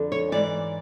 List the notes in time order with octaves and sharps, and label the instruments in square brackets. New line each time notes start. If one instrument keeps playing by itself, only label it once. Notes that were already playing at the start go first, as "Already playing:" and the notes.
Already playing: [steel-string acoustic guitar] F2 D3
C#5
G#2 E3 D5